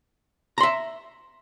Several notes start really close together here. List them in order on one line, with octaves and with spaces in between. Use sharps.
A#5 C6 E5